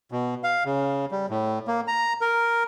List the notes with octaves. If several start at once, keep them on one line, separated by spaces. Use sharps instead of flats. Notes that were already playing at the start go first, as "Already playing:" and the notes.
B2
F5
C#3
G3
A2
A#3
A#5
A#4